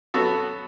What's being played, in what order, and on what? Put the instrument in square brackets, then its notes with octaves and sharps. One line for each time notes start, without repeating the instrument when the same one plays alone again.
[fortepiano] F#3 B3 F#4 A4